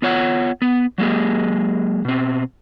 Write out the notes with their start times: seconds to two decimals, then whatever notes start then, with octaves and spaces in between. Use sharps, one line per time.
0.02 B3 F4 C#5 F5 F#5
0.62 B3
0.98 F#3 G#3 A#3 G4 G#4
2.05 B2 C4